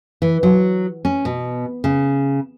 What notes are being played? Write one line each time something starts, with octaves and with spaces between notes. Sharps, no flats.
E3
F#3
C#4
B2
C#3